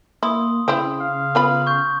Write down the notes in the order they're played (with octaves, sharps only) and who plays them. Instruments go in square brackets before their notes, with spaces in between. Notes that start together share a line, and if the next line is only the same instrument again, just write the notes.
[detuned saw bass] A#3 [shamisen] E4 [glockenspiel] C6 D#6
[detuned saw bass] C#3 [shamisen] C4 E4
[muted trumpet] F5
[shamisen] B3 F4 B5
[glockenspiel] C#6 G6